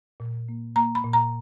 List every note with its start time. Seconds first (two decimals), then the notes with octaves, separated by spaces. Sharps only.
0.20 A#2
0.49 A#3
0.76 A#3 A#5
0.95 B5
1.04 A#2
1.13 A#5